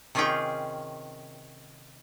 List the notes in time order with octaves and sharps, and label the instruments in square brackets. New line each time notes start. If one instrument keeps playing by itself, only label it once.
[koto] C3 D#3 C#4 F4 G#4 G5